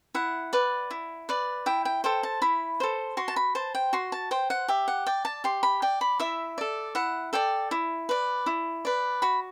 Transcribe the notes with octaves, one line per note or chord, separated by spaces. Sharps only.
E4 F#5
B4 D5
E4
B4 D5
E4 G5
G5
A4 C5 G5
A5
E4 B5
A4 C5
F#4 C6
A5
B5
C5 A5
G5
F#4 C6
A5
C5 G5
F#5
G4 E5
F#5
D5 G5
A5
G4 C6
B5
D5 G5
B5
E4 E5
A4 D5
E4 F#5
A4 D5 G5
E4
B4 D5
E4
B4 D5
F#4 B5